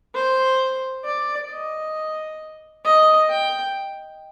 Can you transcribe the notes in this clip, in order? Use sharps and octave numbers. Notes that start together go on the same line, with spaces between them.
C5
D5
D#5
D#5
G5